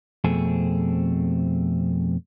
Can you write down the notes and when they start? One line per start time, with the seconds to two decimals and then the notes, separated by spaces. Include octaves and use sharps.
0.24 F2 B2 A3 C4 G#4